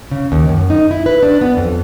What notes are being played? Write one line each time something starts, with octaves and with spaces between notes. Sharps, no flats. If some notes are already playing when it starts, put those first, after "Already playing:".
C#3
D#2
F#2
D#4
E4
B4
D4
B3
F2